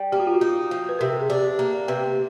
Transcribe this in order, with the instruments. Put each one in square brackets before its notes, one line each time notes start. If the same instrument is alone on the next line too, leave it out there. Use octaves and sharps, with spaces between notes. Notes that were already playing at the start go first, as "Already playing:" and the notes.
Already playing: [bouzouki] G3
[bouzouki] A#3 [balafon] G4
[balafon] F#4
F4
F#4
[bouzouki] D#4
F3
[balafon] B4
[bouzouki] C3 [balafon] A#4
[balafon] A4
G#4
[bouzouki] D4 [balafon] G4
[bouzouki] A#3
[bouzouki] C3 [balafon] B4